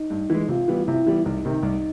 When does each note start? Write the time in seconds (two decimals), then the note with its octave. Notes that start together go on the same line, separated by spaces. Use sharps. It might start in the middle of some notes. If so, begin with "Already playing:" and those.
Already playing: D#4
0.10 G2
0.30 E3 G#3
0.48 C3 F4
0.68 E3 G3 B3
0.87 C3 E4
1.07 E3 G3 B3
1.25 C2 D#4
1.45 C3 D#3
1.63 C2